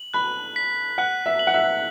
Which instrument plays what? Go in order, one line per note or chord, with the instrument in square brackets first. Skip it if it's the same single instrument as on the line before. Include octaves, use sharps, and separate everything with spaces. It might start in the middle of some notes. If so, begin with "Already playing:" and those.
Already playing: [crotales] F#7
[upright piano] B5 [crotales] F#6
[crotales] B6
[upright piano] F#5 [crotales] F#6
[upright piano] E5
[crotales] F#7
[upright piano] F#5
E5